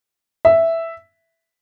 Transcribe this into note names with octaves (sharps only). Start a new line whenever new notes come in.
E5